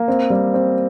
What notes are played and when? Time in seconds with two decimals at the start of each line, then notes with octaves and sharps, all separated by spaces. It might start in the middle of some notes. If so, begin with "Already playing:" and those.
Already playing: A#3
0.08 C4
0.30 G3
0.54 C4